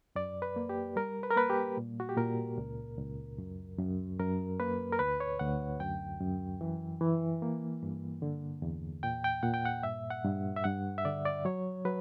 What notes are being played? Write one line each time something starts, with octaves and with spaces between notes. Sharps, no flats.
F#2 D5
B4
A#3
G4
G3 A#4
B4
A#4
A#3 B4
G4
A#2
F#4
G4
A#2 A#4
C#2
C#2
F#2
F#2
F#2 A#4
A#3 B4
A#4
D2 B4
C#5
D2 F#5
F#2 G5
F#2
E3
E3
A#3
G2
D3
E2
A#2 G5
G5
A#2 F#5
G5
F#5
G2 E5
F#5
G2
E5
G2 F#5
E5
D3 D5
D5
F#3 C#5
F#3 B4